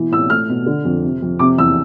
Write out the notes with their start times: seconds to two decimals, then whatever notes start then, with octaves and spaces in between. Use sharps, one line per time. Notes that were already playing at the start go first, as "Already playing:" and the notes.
Already playing: B2 E3
0.12 A2 E6
0.30 A3 F6
0.49 B2
0.66 D3
0.85 F2
1.03 C3
1.22 F2
1.39 C3 D6
1.58 E2 E6